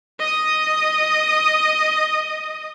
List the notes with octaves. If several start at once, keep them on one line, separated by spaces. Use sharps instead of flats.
D#5 D#6